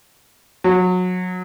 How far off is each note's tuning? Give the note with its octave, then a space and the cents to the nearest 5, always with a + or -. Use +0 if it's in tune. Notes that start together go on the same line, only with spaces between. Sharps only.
F#3 -25